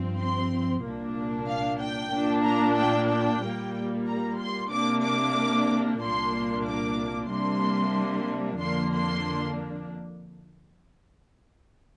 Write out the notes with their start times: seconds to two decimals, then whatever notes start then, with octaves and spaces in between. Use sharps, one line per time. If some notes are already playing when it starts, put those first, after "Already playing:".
Already playing: G2 F3 C4
0.19 C6
0.83 C2 A#2 A#3 D4
1.48 F5
1.80 G5
2.12 A#2 A#3 D4
2.45 A#5
2.77 G5
3.10 G5
3.42 A#2 G3 A#3
4.07 A#5
4.39 C6
4.72 C3 A#3 D4 D6
5.04 D6
6.02 C2 A#2 A#3 D4 C6
6.66 D6
7.31 C3 G3 A#3 D4 C6
8.60 F2 D3 A#3 D4 C6
8.93 C6